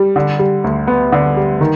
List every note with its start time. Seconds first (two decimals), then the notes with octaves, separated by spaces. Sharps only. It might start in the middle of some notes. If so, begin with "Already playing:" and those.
Already playing: G3
0.16 D3
0.39 G3
0.64 D2
0.87 B3
1.12 D3
1.37 G3
1.61 D#3